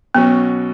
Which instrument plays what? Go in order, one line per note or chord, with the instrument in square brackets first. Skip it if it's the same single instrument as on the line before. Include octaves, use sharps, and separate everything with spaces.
[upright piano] B2 F#3 C#4 F#4 C#5 [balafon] B3